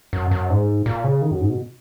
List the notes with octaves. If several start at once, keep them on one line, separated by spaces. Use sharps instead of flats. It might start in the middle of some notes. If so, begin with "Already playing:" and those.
F#2
F#2
G#2
A#2
C#3
D#3
F#2
G#2
B2